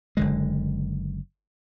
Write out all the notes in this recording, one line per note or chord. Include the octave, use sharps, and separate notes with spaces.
F#1 D3 G#3